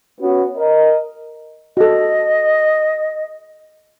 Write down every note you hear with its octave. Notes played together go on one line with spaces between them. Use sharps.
B3 C#4 F#4
A#4 D#5
F#4 A4 D#5